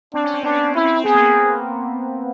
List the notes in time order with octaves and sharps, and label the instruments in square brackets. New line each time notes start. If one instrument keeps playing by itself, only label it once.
[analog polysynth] C4 [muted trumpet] D4
[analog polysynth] C#4
C4
[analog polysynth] B3 [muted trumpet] D4
[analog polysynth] C4
[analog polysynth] C#4 [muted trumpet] E4
[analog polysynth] C4
C4
[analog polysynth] B3 [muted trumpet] G#4
[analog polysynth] A#3